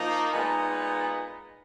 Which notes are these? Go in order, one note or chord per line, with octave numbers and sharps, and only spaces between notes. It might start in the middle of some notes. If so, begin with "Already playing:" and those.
Already playing: F3 A#3 D#4
A#2 G#3 B3 D#4